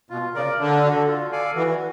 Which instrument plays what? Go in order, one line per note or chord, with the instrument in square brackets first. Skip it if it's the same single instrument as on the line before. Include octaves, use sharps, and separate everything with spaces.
[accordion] B2 [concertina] F4
[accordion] C#3 [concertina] A#4 D5
[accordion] D3 [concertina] D4
[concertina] F#4 A4
F4
A4 D5 F5 G#5
[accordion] E3 [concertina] F#4